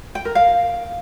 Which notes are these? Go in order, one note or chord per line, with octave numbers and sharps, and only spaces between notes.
G5
A#4
F5